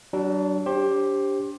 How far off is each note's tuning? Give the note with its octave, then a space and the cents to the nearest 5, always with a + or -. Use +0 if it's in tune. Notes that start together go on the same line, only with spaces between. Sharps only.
F#3 +40 D4 +0
D4 -30 G4 +0 C5 +25